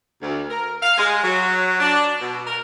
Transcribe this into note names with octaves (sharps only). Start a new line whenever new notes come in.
D2
A#4
F5
G#3
F#3
D4
B2
A#4